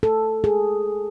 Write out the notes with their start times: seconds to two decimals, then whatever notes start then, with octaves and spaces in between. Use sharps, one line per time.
0.03 A4
0.44 G#4